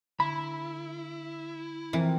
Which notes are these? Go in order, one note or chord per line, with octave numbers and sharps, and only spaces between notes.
D3 E4 B5
E3 F3 C4 A#4